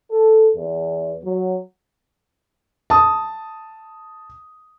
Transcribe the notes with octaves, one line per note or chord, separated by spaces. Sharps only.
A4
E2
F#3
A5 D#6